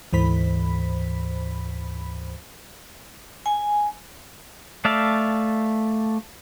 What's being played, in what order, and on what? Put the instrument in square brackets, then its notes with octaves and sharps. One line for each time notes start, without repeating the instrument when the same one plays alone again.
[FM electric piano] D2 G#2 E3 C5 B5 B6
[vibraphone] G#5
[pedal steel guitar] A3 D5 E5 F5 A5